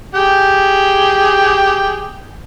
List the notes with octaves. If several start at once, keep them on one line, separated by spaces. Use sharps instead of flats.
G4 G#4 G5